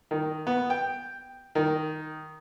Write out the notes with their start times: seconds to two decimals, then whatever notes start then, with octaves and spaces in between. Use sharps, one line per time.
0.11 D#3
0.47 B3
0.70 G5
1.55 D#3